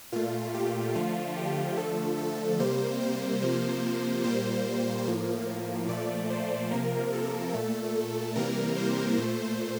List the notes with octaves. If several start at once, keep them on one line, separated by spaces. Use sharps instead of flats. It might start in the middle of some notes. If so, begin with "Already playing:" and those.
A#2 A3 F4
G4
D3 F3 A3 F4
G4
D3 F3 A3 A4
A4
C3 G3 A#3 C5
C5
C3 F3 A#3
A#2 G3 A#3 C5
A2 F3 A#3
A#2 F3 A3 D5
C5
C3 F3 A#3 A#4
A4
A#2 A3
C3 E3 G3 A#3 A#4
C5
A#2 A3